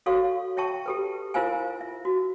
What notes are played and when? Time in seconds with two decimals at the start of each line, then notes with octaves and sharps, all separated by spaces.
0.06 F#4 A4 C#5 F5 C#6
0.57 C#5 E5 G5 A5 C#6
0.86 G4 A4 B4
1.34 E4 F4 A#4 C5 F5 G#5
1.81 E5
2.05 F#4